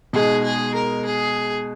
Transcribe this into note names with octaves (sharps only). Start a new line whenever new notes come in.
B2 G#3 D#4 G#4
G#4
A#4
G#4